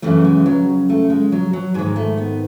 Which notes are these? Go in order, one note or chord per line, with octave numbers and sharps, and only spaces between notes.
F#2 C#3 E3 A3
G#3
F#3
A3
G#3
F#3
F#3
G#2 D#3 G#3
A3
B3